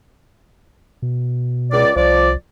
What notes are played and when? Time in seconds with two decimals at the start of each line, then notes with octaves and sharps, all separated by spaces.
1.02 B2
1.72 C#2 D5
1.96 C2 F3 D5